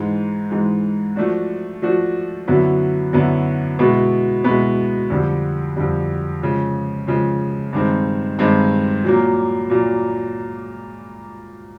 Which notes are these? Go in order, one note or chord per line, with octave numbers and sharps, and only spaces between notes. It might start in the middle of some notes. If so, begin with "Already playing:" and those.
Already playing: G#2 E3 G#3
G#2 E3 G#3
F3 A3 D4 F#4
F3 A3 D4 F#4
F#2 D3 F#3 B3 E4
F#2 D3 F#3 B3 E4
B2 G#3 B3 E4
B2 G#3 B3 E4
F2 D3 G3
F2 D3 G3
C#3 F3 G#3
C#3 F3 G#3
G2 D#3 G#3 C4
G2 D#3 G#3 C4
A#2 F#3 A#3
A#2 F#3 A#3